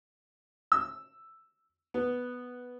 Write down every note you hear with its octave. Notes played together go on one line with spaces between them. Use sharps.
E6
B3